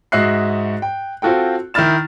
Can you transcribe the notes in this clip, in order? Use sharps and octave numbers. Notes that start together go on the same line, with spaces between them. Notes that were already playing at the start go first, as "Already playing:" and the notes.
G#2 F#4 D#5 E5 F#6 C7
G5
C4 F4 F#4 A4 G5
D#3 E4 B5 F6 A6 E7